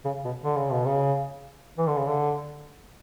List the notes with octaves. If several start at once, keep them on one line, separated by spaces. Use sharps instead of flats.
C#3
B2
D3
C#3
B2
C#3
E3
D3
C#3
D3